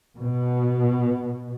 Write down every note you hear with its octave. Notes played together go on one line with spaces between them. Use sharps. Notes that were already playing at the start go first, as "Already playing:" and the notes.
B2